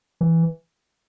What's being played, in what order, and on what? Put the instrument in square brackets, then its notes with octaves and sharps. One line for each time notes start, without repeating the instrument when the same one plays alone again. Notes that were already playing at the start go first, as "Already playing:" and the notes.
[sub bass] E3